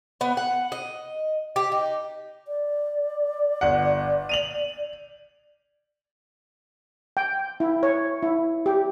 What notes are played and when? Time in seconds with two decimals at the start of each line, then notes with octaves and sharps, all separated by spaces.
0.21 B3
0.37 F#5
0.72 D#5
1.56 G4
1.72 D#4
2.48 D5
3.61 G1 F#5
4.29 D#7 F7 F#7
7.17 G5
7.60 E4
7.83 C#5
8.22 E4
8.66 G4